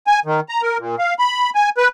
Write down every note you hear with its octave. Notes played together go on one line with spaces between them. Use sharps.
G#5
D#3
A#5
A#4
A#2
F5
B5
G#5
B4